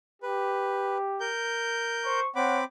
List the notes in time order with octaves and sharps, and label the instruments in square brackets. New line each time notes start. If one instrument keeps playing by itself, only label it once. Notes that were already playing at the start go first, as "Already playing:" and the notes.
[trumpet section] G4 [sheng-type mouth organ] B4
[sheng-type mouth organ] A#4 G6
[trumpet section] C5 C#6
[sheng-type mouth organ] C4 B5 D6 [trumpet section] C#5 F#5